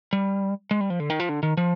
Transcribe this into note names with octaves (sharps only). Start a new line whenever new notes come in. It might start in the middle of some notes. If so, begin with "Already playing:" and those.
G3
G#3
G3
F3
D3
D#3
F3
D3
D#3
F3